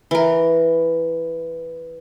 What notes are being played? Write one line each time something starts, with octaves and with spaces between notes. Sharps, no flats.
E3 A#4